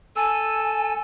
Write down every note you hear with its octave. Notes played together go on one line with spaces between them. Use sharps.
A4 G#5 E6